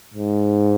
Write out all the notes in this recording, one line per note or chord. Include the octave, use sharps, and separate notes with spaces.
G#2